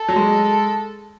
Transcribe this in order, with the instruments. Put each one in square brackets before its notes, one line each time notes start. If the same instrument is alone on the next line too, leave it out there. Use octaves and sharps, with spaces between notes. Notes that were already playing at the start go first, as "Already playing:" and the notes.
Already playing: [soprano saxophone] A4
[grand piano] F#3
G#3